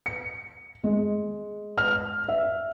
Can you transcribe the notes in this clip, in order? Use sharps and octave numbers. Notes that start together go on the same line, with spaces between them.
C#7
G#3
F6
E5